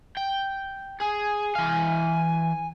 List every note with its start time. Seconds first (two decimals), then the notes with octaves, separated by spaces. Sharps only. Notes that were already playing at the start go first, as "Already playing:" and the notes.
0.17 G5
1.00 G#4 G#5
1.55 E3 F5